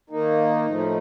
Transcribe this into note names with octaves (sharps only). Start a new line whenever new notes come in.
D#3 A#3 D#4
A2 F3 A3